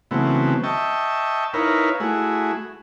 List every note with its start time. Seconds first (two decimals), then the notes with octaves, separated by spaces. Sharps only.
0.11 C#3 E3 F#3 A3 B3 C4
0.63 D#5 E5 G5 A5 C#6
1.54 D#4 E4 A#4 B4 C#5 F5
2.00 A3 E4 F#4 G#4